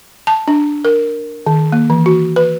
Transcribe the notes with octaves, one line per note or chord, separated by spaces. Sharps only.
A5
D4
A#4
D#3
A#3
E3
F#4
B4